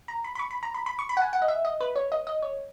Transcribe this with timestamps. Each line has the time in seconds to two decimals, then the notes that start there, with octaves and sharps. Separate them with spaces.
0.08 A#5
0.24 B5
0.35 B5
0.39 C#6
0.51 B5
0.63 A#5
0.74 B5
0.86 B5
0.99 C#6
1.09 B5
1.17 F#5
1.22 G#5
1.33 F#5
1.42 D#5
1.48 E5
1.65 D#5
1.81 B4
1.96 C#5
2.12 D#5
2.27 D#5
2.42 C#5